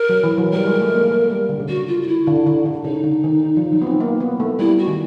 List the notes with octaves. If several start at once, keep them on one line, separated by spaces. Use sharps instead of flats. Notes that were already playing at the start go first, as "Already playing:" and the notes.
Already playing: A#4
F#3
E3
F#3
G3 A#4
G#3
A3
A#3
A3
G3
D3
C#3
D3 F#4
F4
F4
E4
D3
D3
D3
C#3 D#4
D3
D#3
D#3
F3
F#3
B3
C4
A#3
B3
A3
G3 E4
F#4
D#3